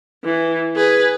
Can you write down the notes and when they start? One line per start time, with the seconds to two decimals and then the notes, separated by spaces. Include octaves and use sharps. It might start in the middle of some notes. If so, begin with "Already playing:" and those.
0.25 E3
0.76 G#4 B4